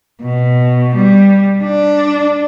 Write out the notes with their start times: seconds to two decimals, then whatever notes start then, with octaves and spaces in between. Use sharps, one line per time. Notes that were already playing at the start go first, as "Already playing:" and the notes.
0.22 B2
0.95 G3
1.63 D4